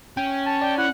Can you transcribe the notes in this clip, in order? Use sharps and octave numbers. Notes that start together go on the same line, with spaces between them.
C#4 G5
A5
D5 G5
E4 F#5